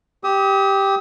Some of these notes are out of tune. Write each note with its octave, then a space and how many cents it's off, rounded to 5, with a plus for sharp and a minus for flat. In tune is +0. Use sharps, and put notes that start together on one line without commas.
G4 +0 D#6 +40